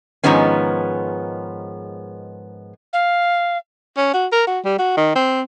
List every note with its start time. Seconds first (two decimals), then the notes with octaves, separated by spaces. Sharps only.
0.23 G#2 D#3 F3 G#3 B3 C#4
2.93 F5
3.97 C#4
4.14 F#4
4.32 A#4
4.47 F#4
4.65 G3
4.79 F#4
4.97 D#3
5.16 C4